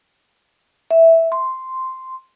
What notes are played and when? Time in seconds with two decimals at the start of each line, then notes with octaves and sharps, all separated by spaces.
0.91 E5
1.32 C6